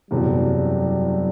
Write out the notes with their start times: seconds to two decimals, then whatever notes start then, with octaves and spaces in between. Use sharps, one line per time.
0.11 F#1 E2 C3 F#3 G3